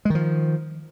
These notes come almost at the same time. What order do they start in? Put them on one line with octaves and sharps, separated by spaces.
G#3 D#3 F3